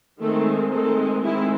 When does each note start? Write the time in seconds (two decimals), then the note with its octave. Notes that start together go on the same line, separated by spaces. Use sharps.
0.20 D#3 G#3 A3 C4 A4
0.72 D#3 G#3 A3 C4 A4
1.23 D#3 G#3 C4 E4